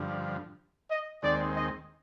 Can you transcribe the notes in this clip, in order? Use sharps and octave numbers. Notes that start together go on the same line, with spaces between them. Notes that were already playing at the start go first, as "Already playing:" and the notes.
Already playing: G2 D3 F3
D#5
D#2 D#3 G#3 C4 D5
D#5